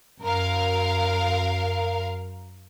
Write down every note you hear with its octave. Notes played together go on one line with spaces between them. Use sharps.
F#2 A#4 F5